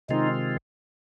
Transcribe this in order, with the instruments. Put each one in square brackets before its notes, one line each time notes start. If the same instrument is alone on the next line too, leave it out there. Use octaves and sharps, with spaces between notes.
[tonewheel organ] C3 D#3 G#3 C4 F4 [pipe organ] D#4